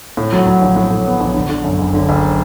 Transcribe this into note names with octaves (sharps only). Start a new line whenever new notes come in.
A2
F#3
F#3
A#1
A2
A2
B3
A#1
D3
D3
F#2
F#1
D3
F#1